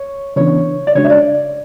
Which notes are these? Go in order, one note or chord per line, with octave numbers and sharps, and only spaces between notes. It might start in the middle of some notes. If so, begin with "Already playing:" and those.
Already playing: C#5
C#3 E3 B3 D4 C#5
D5
C#3 G#3 D4 F#4 C#5
E5
D5